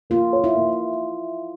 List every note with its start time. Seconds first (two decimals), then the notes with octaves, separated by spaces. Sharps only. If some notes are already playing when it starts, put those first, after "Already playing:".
0.10 A#3 F4
0.33 C#5
0.44 E4
0.55 A#3